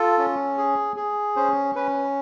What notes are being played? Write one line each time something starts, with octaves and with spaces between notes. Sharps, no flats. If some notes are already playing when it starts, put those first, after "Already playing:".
Already playing: F4 A4
C#4
G#4
G#4
C#4 C5
C#4 B4